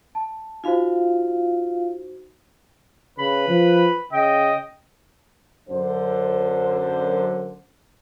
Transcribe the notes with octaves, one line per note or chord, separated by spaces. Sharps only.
A5
D#4 F4 F#4 C5 F5
C#3 B4 B5
F3
C#3 D#5 G5
F#2 D3 C5